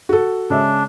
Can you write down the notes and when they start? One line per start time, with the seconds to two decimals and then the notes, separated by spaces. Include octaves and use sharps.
0.09 F#4 A4
0.50 C#3 G#3 D4 E5